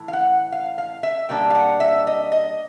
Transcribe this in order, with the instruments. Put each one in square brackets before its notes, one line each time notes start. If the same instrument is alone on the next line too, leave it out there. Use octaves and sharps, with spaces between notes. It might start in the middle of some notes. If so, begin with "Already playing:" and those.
Already playing: [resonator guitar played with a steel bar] A2 E3
F5
F#5
F5
F5
E5
B2 G3 A#3 D4 G5
F5
F#5
E5
D#5
D#5